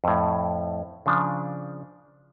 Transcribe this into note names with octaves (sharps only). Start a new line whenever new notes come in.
F2 A2
C#3 F3 D4